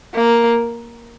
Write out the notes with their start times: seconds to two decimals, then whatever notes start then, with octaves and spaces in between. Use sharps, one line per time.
0.14 A#3